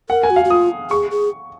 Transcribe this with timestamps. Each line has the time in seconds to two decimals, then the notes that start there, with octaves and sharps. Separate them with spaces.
0.10 A#4 F#5
0.23 G#5
0.30 F#4
0.36 F5
0.45 F#4
0.50 F4 D#6
0.91 G#4 C#6
1.11 G#4